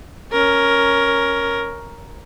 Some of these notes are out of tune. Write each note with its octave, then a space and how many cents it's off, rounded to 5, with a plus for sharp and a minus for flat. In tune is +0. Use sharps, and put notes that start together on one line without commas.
C#4 +5 A#4 +5